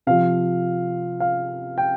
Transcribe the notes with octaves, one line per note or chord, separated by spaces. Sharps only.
C3 F3 F5
F5
G5